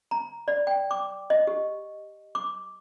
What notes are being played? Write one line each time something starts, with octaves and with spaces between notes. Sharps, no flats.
A#5
D5
G5
D6
D#5
G4
D6